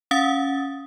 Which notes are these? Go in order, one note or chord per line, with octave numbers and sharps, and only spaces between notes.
C#4 F5 F#5 D#6 A6